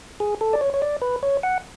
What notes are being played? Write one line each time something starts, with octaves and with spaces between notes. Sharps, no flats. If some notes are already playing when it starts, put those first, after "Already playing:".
G#4
A4
D5
C#5
C#5
D5
B4
C#5
F#5